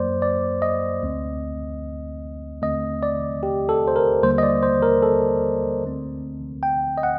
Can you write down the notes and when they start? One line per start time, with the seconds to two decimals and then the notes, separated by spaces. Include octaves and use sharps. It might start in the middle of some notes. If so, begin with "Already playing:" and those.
Already playing: F#2 F#3 A#3 C5 D5
0.22 D5
0.62 D#5
1.02 D2 D3 A3 C4
2.62 D#2 D3 A3 C4 D#5
3.03 D5
3.43 G4
3.69 A4
3.88 C5
3.96 A#4
4.22 D#2 D3 G3 A#3 C5
4.38 D#5
4.43 D5
4.63 C5
4.83 A#4
5.03 A4
5.83 D2 D3 A3 C4
6.63 G5
6.98 D#5
7.03 F#5